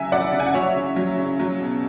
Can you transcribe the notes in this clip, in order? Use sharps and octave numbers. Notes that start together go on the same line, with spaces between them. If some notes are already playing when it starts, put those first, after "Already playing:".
Already playing: C#3 F#3 E5 G#5
F#3 D5 F#5
C#3
G#5
F#5
F#3 C#5 E5
C#3
F#3
C#3
F#3
B2